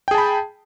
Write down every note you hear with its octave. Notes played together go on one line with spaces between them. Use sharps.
G#4 G5 A5 B5